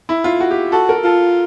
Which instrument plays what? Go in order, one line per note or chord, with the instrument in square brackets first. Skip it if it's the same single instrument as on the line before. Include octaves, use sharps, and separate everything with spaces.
[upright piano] E4
F4
F#4
G4
[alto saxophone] F#4 [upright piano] A4
[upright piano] A#4
[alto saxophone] F4 [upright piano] A4